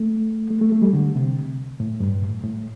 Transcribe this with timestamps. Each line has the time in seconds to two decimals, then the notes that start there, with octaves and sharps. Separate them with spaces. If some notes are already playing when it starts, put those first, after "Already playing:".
Already playing: A3
0.50 A3
0.61 A3
0.72 A3
0.82 G3
0.93 D3
1.15 C3
1.80 A2
2.00 G2
2.23 A2
2.44 A2